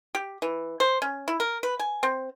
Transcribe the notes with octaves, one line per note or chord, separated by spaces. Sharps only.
G4
E3
C5
C#4
E4
A#4
B4
G#5
C4